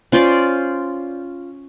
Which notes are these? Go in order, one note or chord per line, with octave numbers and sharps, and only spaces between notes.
C#4 F4 C5 D5